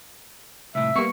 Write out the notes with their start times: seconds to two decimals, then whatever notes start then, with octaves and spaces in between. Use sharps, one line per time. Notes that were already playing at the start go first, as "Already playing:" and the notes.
0.75 C2 A2 E5
0.96 G3 A#3 B3 C#6